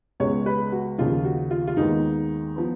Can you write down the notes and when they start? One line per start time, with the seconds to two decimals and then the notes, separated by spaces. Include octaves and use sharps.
0.20 C#2 C#3 G#3 B3 C#5
0.46 B4
0.72 F#4
0.99 D#2 C#3 F3 F4
1.25 F#4
1.51 F4
1.67 F4
1.77 D#2 D#3 G#3 B3 D#4
2.56 F3 B3